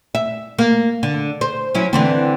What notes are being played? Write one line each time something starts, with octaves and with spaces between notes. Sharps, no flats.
E5
A#3
D3
C5
F#3 C#4 E4
D3 E3 C4